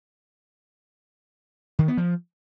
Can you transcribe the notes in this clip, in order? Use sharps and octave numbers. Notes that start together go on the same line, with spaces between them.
D#3
B3
F3